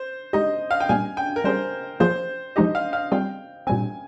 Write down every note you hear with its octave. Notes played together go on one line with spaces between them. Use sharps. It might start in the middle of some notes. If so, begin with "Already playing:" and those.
Already playing: C5
G#3 D#4 G4 D#5
F5
G5
A#2 G3 A#3 G#5
G5
A#4
G3 C#4 G#4 C5
F3 A#3 F4 G#4 C5
F3 G#3 D#4 G4 D#5
F5
F5
G3 C4 F4 G#4 G5
A#2 G3 C4 G#5